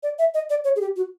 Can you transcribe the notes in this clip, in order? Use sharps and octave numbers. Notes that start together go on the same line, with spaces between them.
D5
E5
D#5
D5
C#5
G#4
G4
F#4